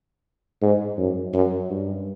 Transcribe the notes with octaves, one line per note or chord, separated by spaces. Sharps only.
G#2
F#2
F#2
G2